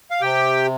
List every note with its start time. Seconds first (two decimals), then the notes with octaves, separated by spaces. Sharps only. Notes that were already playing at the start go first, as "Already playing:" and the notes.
0.11 F5
0.21 C3 G4 G5